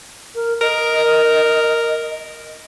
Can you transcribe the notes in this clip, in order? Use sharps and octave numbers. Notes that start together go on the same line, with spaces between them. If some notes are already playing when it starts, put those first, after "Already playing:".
A#4
A#4 D#5